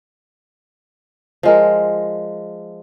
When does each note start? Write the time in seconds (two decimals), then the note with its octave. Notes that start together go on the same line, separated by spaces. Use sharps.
1.43 F3 G#3 A#4